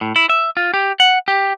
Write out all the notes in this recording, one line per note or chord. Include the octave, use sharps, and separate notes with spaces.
A2
E4
E5
F4
G4
F#5
G4